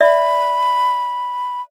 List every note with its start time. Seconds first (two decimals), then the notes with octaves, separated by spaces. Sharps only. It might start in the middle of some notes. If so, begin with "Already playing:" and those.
0.01 D5 E5 B5